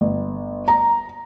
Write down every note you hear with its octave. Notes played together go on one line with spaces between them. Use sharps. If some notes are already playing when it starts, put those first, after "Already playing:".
G1
A#5